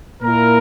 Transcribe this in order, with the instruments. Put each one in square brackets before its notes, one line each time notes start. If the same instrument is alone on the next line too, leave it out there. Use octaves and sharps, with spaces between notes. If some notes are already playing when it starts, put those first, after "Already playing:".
[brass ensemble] A#2 A#3 E4 A#4